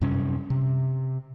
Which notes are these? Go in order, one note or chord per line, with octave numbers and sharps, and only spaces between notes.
F#2 C3 G3 C#4
C3